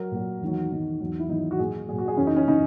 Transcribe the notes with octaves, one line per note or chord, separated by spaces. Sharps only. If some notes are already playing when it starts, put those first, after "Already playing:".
Already playing: F#3 A#4
A#2 F#3
E2 D#3 F#3
E2 D#3 F#3
E2 D#3 F#3
E4
E2 D#3 F#3 D#4
F#4
A#2 F#3 G#4
A#2 F#3 G#4
F#4
G#4
F#2 C#3 E3 C#4
D#4
C#4
C#3 E3 D#4